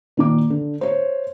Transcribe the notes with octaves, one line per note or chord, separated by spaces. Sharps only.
A#2 D#3 D6
D3
C5 C#5